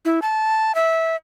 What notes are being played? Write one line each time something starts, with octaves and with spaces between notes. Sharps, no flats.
E4
A5
E5